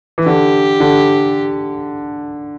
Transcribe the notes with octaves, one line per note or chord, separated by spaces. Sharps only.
E3
D3 G4
D3